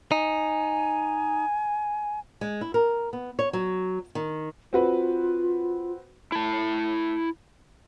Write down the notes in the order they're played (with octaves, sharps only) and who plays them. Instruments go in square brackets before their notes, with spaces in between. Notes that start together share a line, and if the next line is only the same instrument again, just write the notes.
[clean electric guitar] D#4 [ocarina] G#5
[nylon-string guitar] G#3
E4
A#4
B3
C#5
F#3
D#3
[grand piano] C4 F#4 B4 [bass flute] F4
[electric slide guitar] E4 A5